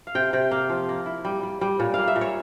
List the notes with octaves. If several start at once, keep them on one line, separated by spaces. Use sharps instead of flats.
F5
C3 G5
C3 G5
A#3 F5
F3
A#3
E4
G3
G3
G3
A#2 C#5
A#3 F5
E5
A#2
C#5